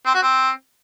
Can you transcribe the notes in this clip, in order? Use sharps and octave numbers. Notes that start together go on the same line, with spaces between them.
C4
F#4
C4